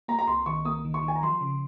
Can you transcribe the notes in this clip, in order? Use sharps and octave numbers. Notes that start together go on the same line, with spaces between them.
A#3 A#5
A#5
C2 C6
D#3 C#6
A#3 D#6
D#3
C#6
D#3
G#5
A#5
F3 C6
C#3